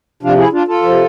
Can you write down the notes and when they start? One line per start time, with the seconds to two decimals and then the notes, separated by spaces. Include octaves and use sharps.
0.23 C3 F3 D4 F4
0.38 E4 G#4
0.52 D4 F4
0.67 F4 A4
0.83 C3 F3